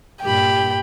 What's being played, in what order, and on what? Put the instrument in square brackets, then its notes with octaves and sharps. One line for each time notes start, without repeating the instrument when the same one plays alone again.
[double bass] G2 A#2 [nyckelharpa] G4 B5 [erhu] G5